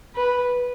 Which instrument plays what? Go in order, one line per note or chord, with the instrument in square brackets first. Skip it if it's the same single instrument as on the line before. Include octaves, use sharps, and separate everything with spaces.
[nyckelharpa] B4